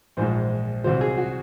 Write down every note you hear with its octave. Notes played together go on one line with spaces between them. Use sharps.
A#1 G#2 F3 G#3 C5
C2 C3 F#3 C5
G#4
F#4